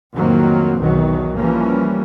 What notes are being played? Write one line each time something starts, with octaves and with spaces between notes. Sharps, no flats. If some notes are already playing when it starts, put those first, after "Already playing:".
F2 A2 D#3 F#3 A#3 C4
B1 E2 B2 D#3 F#3
E3 F3 G3 A#3 C#4